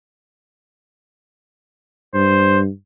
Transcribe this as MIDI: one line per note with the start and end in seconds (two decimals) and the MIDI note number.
2.15 2.68 43
2.15 2.59 72